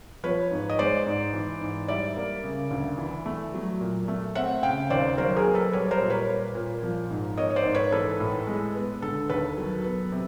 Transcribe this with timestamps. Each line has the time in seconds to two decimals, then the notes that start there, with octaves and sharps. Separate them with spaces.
0.24 F3 B4 C#5
0.51 G#2
0.70 D#5
0.78 G#3 C5 D5
1.06 G#2
1.33 E3
1.61 G#2
1.88 G3 D5 E5
2.16 A#3
2.44 C#3
2.71 D2
2.98 E3
3.26 A3
3.54 F#3
3.81 A#2
4.08 A3
4.35 C4 E5 F#5
4.63 C#3 F5 G5
4.90 D#2 C5 D5
5.18 F#3 A#4 C5
5.36 G#4 A#4
5.46 A#3
5.55 A4 B4
5.73 G3 B4 C#5
5.91 A#4 C5
6.00 A#2
6.10 B4 C#5
6.28 A#3
6.55 A#2
6.83 F3
7.10 G#2
7.38 A#3 C#5 D#5
7.50 C#5
7.56 C5 D5
7.65 G#2
7.74 B4 C#5
7.92 E3 A4 B4
8.20 A2
8.47 G#3
8.75 B3
9.02 D3 A4
9.30 D#2 A4 B4
9.57 F#3
9.85 B3
10.12 C3